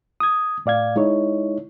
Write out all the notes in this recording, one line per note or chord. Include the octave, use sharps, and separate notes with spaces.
D#6 G#6
A2 D5 F5 G#6
G#3 D#4 E4 C#5